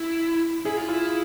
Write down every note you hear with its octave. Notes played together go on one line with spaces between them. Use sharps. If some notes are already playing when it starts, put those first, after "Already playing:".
Already playing: E4
E4 G#4
F4
E4 F4